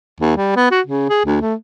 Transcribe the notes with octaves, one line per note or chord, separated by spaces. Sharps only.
D#2
G3
B3
F#4
C#3
G#4
D2
A3